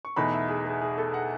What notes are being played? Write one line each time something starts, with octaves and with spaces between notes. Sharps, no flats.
C#6
E2 B2 A3 D#4 B5
E5
G#4
G#4
G#4
A4
F#5